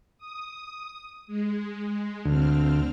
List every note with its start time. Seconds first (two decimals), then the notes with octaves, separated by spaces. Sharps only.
0.18 D#6
1.27 G#3
2.25 D2 C4 F6